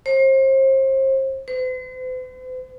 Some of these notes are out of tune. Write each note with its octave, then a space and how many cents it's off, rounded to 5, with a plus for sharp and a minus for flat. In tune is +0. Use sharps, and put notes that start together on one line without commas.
C5 +35
C5 -45